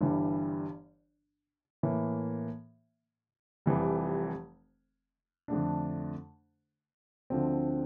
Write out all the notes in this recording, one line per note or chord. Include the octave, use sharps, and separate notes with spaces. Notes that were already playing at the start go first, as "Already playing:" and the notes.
G1 G2 E3 G3
A2 E3 A#3
F1 F2 E3 G3
F2 D3 A3 D4
D2 D3 F3 C4